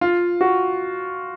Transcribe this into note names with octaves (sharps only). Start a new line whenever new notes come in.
F4
F#4